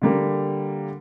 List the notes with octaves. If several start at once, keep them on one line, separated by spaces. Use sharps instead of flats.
D3 G3 A#3